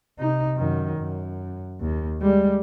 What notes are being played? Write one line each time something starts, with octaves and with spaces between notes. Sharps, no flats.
C3 D#4
F#2 D#3
F#2
D#2
G3 G#3